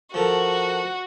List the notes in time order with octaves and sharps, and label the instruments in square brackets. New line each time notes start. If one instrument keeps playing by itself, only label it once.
[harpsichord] F3 A4 A#4 [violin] F#4